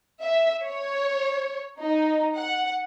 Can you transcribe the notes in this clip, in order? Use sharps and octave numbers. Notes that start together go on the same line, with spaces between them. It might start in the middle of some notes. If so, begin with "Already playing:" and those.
E5
C#5
D#4
F#5